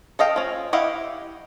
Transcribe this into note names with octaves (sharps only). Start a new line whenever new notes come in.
A4 D#5 F5 G5
F3 C#4
E4 G4 D#5 F5 F#5